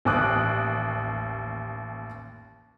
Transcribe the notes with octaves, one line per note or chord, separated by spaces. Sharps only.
A1 D#2 D6 D#6 F#6